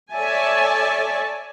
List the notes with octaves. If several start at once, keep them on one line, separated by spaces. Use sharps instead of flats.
A4 C#5 D5 E5 G#5 A5